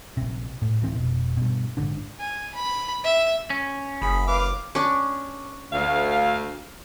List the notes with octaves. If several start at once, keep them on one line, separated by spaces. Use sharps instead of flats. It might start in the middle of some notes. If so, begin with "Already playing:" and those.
A#1 C3
A2
D1 E3 C4
F1 E2 B2
G2 B2
A#1 G#2 D3 D4
G#5
B5
E5
C#4
F#1 G#4 B5
B4 F5 D6
C#4 D4
D2 F5